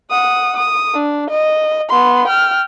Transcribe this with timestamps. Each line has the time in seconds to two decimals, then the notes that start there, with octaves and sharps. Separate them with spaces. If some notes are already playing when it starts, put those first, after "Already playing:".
0.11 F#5 D#6
0.57 D#6
0.94 D4
1.30 D#5
1.89 B3 C6
2.28 G5 F6